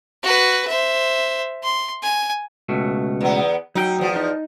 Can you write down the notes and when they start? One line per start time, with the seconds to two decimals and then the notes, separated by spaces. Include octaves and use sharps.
0.23 F#4 B4
0.68 C5 E5
1.63 C6
2.03 G#5
2.69 C#2 B2 A3
3.21 E2 B3
3.75 F#3 D#4 G5
3.98 E2 F3
4.16 D#4